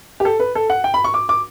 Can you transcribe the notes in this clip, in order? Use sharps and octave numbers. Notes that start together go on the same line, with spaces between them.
G4
A4
B4
A4
F#5
G5
B5
C#6
D6
D6